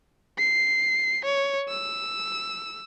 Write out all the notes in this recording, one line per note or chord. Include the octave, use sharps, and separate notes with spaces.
C7
C#5
E6